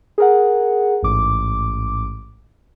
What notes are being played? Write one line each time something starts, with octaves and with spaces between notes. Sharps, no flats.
G#4 A#4 F#5
A1 G#2 D6